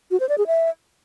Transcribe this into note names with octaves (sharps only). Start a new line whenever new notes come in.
F#4
C5
D5
G#4
E5